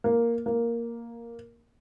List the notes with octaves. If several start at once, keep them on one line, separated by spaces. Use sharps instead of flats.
A#3
A#3